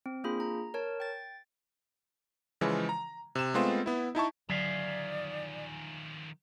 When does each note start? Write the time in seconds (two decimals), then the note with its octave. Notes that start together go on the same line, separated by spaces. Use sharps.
0.06 C4
0.24 A#3 D4 F4 G#4 B5
0.40 A#5
0.74 A#4 C#5 A5
1.00 G5 A6
2.61 C#3 E3 F3 G#3
2.89 A#5
3.35 C3 E7
3.54 G#3 A3 B3 C4 F4
3.86 B3 E4
4.15 D#4 E4 A5 C#6
4.49 D3 D#3 F3 F#3 G#4 D5 E5 F5